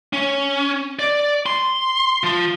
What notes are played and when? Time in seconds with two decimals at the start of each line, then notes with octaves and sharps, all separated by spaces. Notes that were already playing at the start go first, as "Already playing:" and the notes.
0.13 C#4
0.99 D5
1.46 C6
2.23 F3